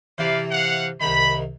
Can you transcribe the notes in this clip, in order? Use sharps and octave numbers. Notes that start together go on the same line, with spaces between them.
C3 E3 B4 C5 D5 F5
F5 F#5
C2 D#3 B5